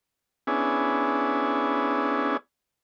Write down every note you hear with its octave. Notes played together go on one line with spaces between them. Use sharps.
B3 C#4 D4 E4 G#4